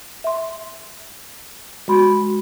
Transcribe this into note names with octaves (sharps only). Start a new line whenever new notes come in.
E5 C6
G#3 F#4 B5 C6